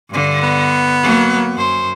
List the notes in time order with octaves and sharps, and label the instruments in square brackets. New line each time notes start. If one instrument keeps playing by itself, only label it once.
[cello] G2 D3
[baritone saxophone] B3
[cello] F#3 A#3
F#2 C5